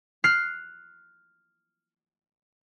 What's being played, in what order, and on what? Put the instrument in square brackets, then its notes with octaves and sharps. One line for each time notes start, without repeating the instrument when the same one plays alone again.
[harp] F6 F#6 C7